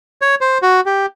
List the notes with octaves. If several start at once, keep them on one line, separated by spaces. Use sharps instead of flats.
C#5
C5
F#4
G4